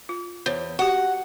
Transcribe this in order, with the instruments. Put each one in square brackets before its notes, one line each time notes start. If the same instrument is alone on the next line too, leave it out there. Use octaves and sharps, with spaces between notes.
[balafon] F4
[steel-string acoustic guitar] E2 [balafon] C5 C#5
[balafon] F#4 G4 [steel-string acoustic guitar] F#5